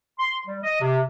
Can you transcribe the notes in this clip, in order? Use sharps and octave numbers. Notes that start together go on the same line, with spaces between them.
C6
G3
D#5
C3